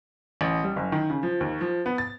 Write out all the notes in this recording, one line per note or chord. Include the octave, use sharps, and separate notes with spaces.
A1
G3
F#1
D#3
C#3
F3
D#2
F3
B3
A6